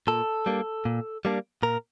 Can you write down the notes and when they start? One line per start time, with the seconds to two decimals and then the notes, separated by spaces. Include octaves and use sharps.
0.07 A#2 A4
0.46 G3 A#3 D4
0.85 A#2
1.25 G3 A#3 D4
1.63 A#2 A#4